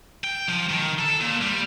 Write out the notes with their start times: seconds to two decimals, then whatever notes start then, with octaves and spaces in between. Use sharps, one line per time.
0.24 G5
0.48 F3
0.69 D#3
0.99 A4
1.21 A#2
1.42 G3